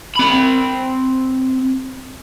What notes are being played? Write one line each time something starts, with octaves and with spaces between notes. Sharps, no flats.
C4 B5